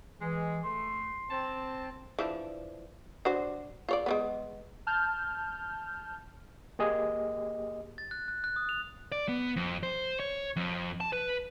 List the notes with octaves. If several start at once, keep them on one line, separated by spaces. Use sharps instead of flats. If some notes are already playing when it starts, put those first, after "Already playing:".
E3 G#3
A3 C6
C4 A5
E3 F3 D4
D4 F#4 C5
F4 C#5 D5
G#3 A#3 B3
A5 F6 G6
A#3 G4 G#4 D#5
A6
F#6
F#6
F#6
D#6
F7
D5
B3
F2
C5
C#5
F2
A5
B4